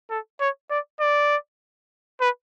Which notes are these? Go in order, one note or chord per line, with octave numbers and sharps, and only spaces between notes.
A4
C#5
D5
D5
B4